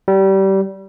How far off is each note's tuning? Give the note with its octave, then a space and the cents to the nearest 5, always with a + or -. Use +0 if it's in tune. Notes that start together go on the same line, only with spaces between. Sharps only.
G3 -25